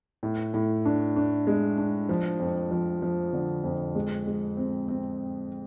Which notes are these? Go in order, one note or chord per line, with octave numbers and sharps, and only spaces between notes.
A2
A2
D4
D4
G#3
D4
F3
F2
F3
F3
D3
F2
G#3
G#3
C4
C4